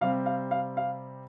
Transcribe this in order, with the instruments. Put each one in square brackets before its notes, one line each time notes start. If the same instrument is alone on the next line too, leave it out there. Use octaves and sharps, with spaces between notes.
[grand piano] C3 G3 C4 [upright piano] F5
[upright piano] F5
F5
F5